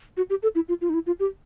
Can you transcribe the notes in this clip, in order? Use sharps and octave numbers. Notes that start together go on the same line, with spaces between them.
F#4
G4
A4
E4
F4
F4
D#4
E4
F4
G4